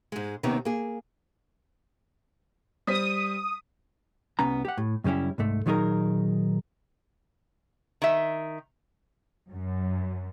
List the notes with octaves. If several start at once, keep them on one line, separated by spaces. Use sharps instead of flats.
G#2 G#3
D#2 C3 D#3 B3 C#4 D#4
A#3 G#4
G3 C5 D#6 B6
C2 B3 C#4 A#5
G4 F#5
A2
F#2 C#3 G3 C#4 E4
C2 G#2 A3
A#2 D#3 F#3 D#4 G#4 A#4
D#3 E5
F#2